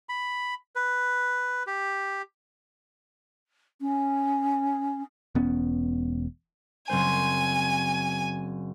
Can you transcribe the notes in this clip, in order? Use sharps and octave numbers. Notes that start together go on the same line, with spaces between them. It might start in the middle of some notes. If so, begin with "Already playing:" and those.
B5
B4
G4
C#4
E1 B3 C#4
F#1 C4 C5 G#5